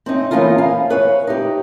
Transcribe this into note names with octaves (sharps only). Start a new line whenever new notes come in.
C4 C#4 D#4
E3 A#3 B3 C#4 D#4 F4
F5 G#5
B4 C#5
D#4 G4